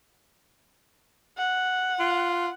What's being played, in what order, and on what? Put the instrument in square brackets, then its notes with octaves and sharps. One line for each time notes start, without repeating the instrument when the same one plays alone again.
[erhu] F#5
[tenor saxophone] F4